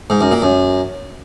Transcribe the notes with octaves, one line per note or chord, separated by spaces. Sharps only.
G#2
F#2
A#2
F#2